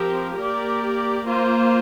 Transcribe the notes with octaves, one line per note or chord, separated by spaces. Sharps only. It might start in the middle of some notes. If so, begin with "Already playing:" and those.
Already playing: F3 C4 G4 A#4
A#3 G4 A#4 D5
A#3 F4 C5